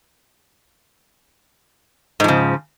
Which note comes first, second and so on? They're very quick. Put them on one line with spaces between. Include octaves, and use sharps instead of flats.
G#2 F3 C#3